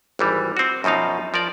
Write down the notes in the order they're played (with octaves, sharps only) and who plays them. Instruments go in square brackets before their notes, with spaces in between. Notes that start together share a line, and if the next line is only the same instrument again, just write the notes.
[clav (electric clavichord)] G#1 E3 G3
C4 F#4
F#2 B2 F3 D#4 F5
F3 A#4 D5